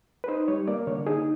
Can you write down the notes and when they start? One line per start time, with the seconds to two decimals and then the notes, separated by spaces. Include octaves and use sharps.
0.24 B4
0.28 D#4 C5
0.48 G3 C#5
0.68 A#3 D5
0.87 D3 C#5
1.06 D#4 G#4